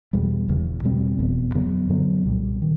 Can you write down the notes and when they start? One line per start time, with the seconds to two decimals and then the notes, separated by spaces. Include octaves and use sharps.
0.13 E2 B2 G3
0.48 E1 E2 C#3 E3
0.83 E2 B2 G3 C4
1.18 F1 E2 B2
1.54 F2 C#3 F#3 B3
1.89 F#2 D3 F#3 B3
2.25 C2 A#2 G3
2.62 D#3